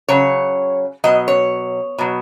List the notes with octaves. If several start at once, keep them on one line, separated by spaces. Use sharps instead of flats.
C#3 F#3 C#5
B2 F#3 D#5
C#5
B2 F#3